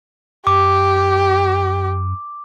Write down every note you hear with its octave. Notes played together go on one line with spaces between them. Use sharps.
F#2 G4 D6